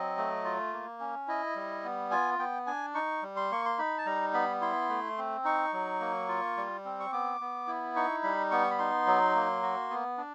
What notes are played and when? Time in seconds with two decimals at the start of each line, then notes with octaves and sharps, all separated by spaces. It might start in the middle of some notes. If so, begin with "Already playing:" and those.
Already playing: F#3 C4 D#5
0.17 A3
0.44 F4
0.73 A#3
1.00 C#4
1.28 E4 D#5
1.56 G3
1.84 B3
2.11 F4 G#5
2.39 B3 G5
2.67 D4 G#5
2.95 D#4 C#6
3.22 G3
3.36 C6
3.51 A#3 C#6
3.66 C6
3.78 D#4 B5
3.98 A5
4.06 G3 A#5
4.33 B3 B5
4.61 E4 C6
4.89 A3
5.18 C4
5.45 D#4 C#6
5.73 F#3
6.00 A#3
6.28 F4
6.57 G3
6.85 C4
7.00 C#6
7.13 B3 D6
7.41 B3
7.67 E4
7.96 D#4 C#6
8.23 G3 B5
8.51 B3 C#6
8.71 B5
8.79 D#4 C6
9.06 F#3
9.35 A#3
9.62 F#4
9.90 B3
10.18 D4